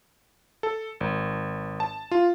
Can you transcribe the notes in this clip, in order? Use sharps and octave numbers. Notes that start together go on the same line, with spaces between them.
A4
G#1
A5
F4